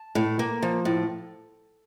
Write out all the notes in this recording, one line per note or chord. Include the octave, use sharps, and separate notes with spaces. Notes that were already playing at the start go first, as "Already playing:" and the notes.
Already playing: A5
A2
A#3
F3
A2